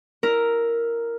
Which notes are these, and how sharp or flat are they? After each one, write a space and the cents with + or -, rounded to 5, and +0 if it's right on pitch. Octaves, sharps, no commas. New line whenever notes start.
E4 -5 A#4 +0